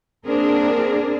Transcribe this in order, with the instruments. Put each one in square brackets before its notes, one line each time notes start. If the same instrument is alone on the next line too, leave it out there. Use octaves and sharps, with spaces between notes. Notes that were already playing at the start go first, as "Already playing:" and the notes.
[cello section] A#3 C4 D4 G#4 A#4